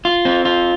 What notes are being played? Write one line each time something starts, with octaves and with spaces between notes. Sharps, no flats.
F4
C4
F4